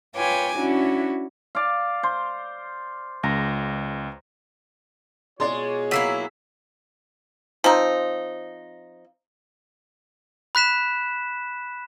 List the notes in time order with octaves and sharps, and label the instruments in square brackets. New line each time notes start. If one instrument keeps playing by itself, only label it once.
[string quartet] F4 B4 C#5 G5 G#5 D6
C#4 D4 E4 F#4
[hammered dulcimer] D5 F5
C5
[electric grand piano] C#2 [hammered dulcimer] A#5
[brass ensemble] B2 F4 C#5 [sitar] G#3 [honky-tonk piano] D5 C6
[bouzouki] F#3 A#3 E4 [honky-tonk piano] E6 B6 E7
[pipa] F3 C4 D#4
[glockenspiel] B5 F#6 B6 E7